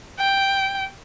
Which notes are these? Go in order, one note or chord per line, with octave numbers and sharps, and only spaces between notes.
G5